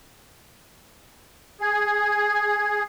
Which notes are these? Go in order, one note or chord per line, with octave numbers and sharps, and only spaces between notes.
G#4